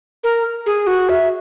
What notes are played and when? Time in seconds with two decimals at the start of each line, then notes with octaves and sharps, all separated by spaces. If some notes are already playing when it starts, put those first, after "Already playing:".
0.24 A#4
0.66 G#4
0.87 F#4
1.09 E5